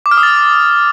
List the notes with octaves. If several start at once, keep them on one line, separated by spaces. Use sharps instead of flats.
D6
F6
D#6
A6